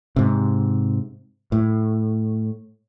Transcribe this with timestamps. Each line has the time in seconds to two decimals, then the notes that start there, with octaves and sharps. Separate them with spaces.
0.16 G#2 C3
1.52 A2